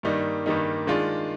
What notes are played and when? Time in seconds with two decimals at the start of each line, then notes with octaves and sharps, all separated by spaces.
0.03 G2 D#3 G3 A#3 D#4
0.46 G2 D#3 G3 A#3 D#4
0.87 D#3 G#3 D4 F4